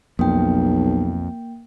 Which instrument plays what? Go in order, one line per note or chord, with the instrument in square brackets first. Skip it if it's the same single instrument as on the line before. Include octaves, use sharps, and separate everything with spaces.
[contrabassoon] B1 [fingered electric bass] F2 [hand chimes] A#3 G5